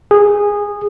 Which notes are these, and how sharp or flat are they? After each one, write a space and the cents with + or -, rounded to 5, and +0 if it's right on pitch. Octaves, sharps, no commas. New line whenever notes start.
G#4 -15